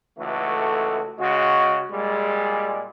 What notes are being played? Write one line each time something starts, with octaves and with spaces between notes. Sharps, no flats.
C#2 E3 A3 F#4 A4
C#3 G#3 F#4
A#2 G3 G#3